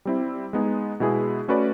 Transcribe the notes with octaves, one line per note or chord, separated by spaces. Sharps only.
G3 C4 E4
G#3 B3 D#4 G#4
B2 G#3 B3 E4 G#4
A3 C#4 F#4 B4 D5